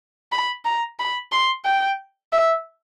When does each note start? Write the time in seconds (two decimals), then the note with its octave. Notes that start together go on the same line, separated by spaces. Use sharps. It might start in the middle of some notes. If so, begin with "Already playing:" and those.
0.32 B5
0.65 A#5
0.99 B5
1.32 C6
1.65 G5
2.33 E5